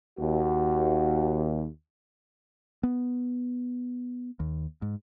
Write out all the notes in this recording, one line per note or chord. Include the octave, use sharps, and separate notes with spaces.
D#2 F#4
B3
D#2
G#2